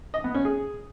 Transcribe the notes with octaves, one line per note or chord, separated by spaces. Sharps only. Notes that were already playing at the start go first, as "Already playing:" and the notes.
D#5
B3
C#4
G#4